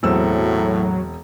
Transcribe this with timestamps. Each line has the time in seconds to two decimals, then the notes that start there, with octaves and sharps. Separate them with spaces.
0.03 E1 A2 F#3 C4 E6